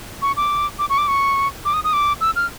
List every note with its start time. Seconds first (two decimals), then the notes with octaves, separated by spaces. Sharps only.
0.22 C#6
0.37 D6
0.79 D6
0.90 C#6
0.98 D6
1.08 C#6
1.65 D6
1.74 D#6
1.84 D#6
1.93 D6
2.21 E6
2.36 F6